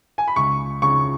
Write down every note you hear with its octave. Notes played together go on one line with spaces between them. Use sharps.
G#5
B5
C#2 C#6
C#3 C#6